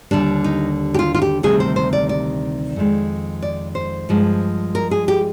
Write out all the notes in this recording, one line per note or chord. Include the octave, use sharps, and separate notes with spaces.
D#2 D3 G3 D4
D#4
G4
F4
F4
G4
D2 C3 D#3 G3 G#4
C5
C5
D5
D5
F2 D#3 G#3
D5
C5
G2 F3 G#3
A#4
G#4
G4